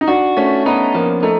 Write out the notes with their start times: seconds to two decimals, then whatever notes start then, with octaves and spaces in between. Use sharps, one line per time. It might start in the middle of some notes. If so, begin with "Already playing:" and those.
0.01 D#4
0.08 D4 F#4
0.37 A3 C#4
0.66 B3 D#4
0.94 F3 A#3
1.23 A3 D#4